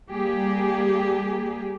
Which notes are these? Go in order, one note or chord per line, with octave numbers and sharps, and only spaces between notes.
G3 A#3 G4 G#4